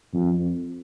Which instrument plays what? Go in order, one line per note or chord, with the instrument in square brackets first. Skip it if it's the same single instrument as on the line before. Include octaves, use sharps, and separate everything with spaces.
[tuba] F2